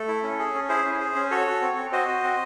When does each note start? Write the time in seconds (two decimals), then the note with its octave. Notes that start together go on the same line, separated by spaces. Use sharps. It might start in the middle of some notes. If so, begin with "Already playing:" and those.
Already playing: A3 A4
0.08 E4
0.23 C#4
0.39 G#4
0.55 C#4
0.69 E4 G#4 C5
0.85 C#4
1.00 G#4
1.16 C#4
1.31 F#4 A4 C#5
1.47 F#4
1.62 C4
1.77 C4
1.92 F#4 C5 D#5
2.08 F#4
2.24 C4